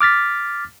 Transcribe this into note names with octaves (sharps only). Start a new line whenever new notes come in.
D6 F6 A6 B6